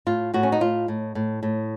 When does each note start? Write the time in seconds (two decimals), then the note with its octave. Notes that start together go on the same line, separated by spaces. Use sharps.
0.07 A2 F4
0.34 A2 F#4
0.43 C#4
0.52 D#4
0.61 A2 F4
0.88 A2
1.15 A2
1.43 A2